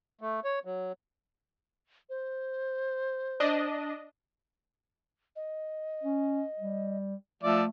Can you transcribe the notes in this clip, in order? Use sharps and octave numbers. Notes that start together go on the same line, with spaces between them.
A3
C#5
F#3
C5
D4 D#5
D#5
C#4
G3
F3 A3 D5 E5